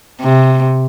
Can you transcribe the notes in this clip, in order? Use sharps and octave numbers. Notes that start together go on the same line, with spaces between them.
C3